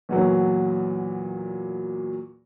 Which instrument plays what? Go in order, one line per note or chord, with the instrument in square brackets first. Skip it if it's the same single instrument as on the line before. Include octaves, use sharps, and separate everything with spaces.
[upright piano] E2 A#2 F#3